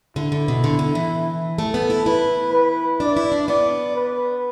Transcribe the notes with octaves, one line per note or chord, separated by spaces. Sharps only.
D3 E4
D3
B2
D3
D3
E3
A3 A4
B3
E4
E4 B4
B4
D4 D5
E4
D4
B3 D5
B4